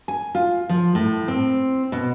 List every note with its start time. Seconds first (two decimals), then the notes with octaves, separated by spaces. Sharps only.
0.08 G#5
0.35 F4
0.69 F3
0.95 A2
1.28 C4
1.92 B2